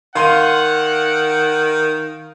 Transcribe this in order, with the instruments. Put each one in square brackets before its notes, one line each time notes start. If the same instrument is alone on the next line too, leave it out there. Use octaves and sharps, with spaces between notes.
[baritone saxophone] D#3 [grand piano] F5 C6 D#7 [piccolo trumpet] F#5